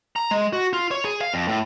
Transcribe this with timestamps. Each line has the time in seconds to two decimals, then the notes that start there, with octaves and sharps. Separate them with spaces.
0.16 A#5
0.31 G#3
0.53 F#4
0.73 F4
0.91 C#5
1.05 G#4
1.21 F5
1.34 F2
1.48 A2